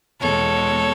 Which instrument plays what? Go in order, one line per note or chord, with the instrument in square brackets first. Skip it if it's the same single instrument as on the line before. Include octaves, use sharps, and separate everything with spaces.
[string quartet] E2 B2 G#3 A4 C#5